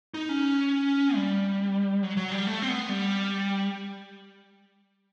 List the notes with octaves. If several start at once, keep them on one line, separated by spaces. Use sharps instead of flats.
D#4
C#4
G3
F#3
F#3
G3
A3
C4
B3
G3